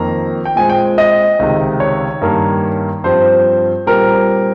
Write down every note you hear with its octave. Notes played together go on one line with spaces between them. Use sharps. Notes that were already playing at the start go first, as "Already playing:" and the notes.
Already playing: F2 D#3 A#3 A#5
G5
A#2 G#3 C4 G#5
G5
D#5
C#2 C3 D#3
C#5
G2 D#3 A#3
G2 F3 C4 C5
A#2 G3 C4 A#4